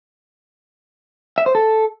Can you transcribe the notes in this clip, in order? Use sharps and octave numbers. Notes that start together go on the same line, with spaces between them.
E5
C5
A4